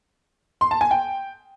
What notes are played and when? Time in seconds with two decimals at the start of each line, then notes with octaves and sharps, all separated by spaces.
0.61 C6
0.71 A5
0.81 G#5
0.91 G5